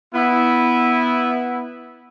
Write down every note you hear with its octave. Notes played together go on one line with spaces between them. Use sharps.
B3 E4